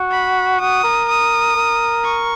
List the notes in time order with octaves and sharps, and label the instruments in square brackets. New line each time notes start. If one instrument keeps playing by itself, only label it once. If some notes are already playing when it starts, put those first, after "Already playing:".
Already playing: [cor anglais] F#4
[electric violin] B5
[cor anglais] F#4 [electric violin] D#6
[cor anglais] A#4
[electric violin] D#6
[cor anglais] A#4
[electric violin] C#6